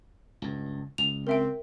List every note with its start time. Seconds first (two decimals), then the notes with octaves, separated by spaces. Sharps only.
0.42 C#2 G2
0.98 C#2 F7
1.27 C4 A#4 E5 G5